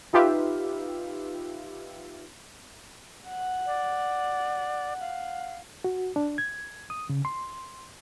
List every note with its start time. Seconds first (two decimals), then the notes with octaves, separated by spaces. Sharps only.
0.13 D#4 F4 G4 B4 E5 F5
3.27 F#5
3.66 D5
5.00 F5
5.84 F#4
6.16 D4
6.38 G#6
6.90 D#6
7.10 C#3
7.25 C6